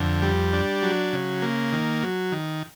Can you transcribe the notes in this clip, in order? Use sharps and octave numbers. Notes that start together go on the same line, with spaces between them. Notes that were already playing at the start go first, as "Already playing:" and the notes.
Already playing: F2 D3
G3
D4
F#3
C#3
A#3
D#3
F#3
D#3